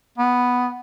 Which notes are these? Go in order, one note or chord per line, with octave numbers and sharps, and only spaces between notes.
B3